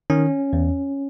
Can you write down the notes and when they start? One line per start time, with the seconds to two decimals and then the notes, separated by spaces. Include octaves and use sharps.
0.10 D#3 C#4
0.53 E2